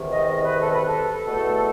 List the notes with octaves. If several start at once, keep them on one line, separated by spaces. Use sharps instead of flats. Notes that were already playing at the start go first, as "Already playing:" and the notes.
Already playing: E2 C3 D#3
D#5
D#5
B4
A4
B4
A4
E2 B2 A3